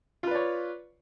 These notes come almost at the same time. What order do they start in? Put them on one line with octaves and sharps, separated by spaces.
F4 B4 D5 C#5